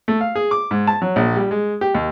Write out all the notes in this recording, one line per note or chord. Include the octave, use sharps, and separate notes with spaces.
A3
F5
G#4
D6
G#2
A5
F#3
A#1
G3
G#3
G4
D#2